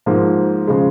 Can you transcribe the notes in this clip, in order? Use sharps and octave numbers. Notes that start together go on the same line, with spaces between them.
G#2 F3 A#3
C#3 F3 G#3